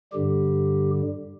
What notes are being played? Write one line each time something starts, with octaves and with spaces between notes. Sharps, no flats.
G2 D3 G3 G4